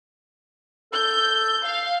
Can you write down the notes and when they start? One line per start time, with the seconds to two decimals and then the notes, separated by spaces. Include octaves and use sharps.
0.93 A4 G6
1.64 F5